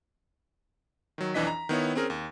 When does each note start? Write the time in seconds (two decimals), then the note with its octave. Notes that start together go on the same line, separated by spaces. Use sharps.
1.18 D#3 F#3
1.34 B1 F2 E3 D4 D#5 B6
1.47 A#5
1.69 D#3 B3 E4 C#5
1.95 C4 C#4 G#4 A#4
2.10 D#2